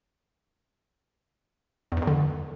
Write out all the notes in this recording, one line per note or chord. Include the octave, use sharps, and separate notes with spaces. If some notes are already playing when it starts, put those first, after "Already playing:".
E2
G2
E2
D3